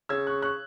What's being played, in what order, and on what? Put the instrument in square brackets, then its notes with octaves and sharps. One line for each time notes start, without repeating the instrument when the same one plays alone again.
[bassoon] C#3 [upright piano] E6 G#6
[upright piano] C#6 F#6
C#6 F#6